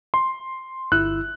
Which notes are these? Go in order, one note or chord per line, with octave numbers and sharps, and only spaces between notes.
C6
G1 E4 E6 F#6